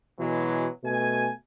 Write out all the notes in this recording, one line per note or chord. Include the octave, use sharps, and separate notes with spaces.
B2 E3 F#3 G#3
B2 A3 G#5